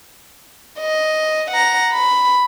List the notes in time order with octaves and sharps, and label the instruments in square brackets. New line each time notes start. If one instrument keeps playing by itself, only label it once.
[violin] D#5
F#5 A#5
B5